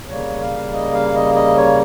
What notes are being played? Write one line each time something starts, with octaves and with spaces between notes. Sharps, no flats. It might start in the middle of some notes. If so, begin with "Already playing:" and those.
C#3 G3 A#3 C#5
F5
D#5
F5
D#5
D#5
C#5